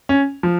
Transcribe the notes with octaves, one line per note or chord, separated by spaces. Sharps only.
C#4
F3